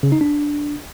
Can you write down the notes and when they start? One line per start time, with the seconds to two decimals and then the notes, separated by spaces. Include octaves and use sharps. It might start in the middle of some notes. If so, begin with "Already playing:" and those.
0.03 C#3
0.12 D#4
0.21 D4